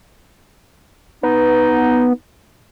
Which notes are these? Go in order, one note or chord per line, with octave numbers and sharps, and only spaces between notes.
B3 D#4